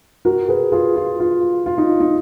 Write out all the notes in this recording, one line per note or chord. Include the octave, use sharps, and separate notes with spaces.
F#4 A#4
G#4 B4
F4 G#4
F4
F4
F4
D#4
D#4